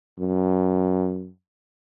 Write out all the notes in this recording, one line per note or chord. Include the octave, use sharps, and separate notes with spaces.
F#2